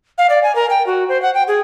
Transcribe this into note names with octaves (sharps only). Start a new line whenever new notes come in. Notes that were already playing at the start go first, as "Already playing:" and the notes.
F5
D5
G#5
A#4
G5
F#4
C5
F#5
G5
G#4